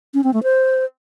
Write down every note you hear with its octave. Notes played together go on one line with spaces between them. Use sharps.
C#4
C4
A3
C5